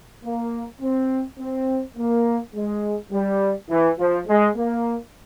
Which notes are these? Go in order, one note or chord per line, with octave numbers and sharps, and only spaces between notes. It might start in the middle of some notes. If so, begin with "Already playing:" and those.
A#3
C4
C4
A#3
G#3
G3
E3
F3
G#3
A#3